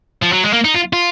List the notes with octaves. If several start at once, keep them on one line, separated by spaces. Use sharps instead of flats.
F3
F#3
G#3
A#3
D#4
F4
F4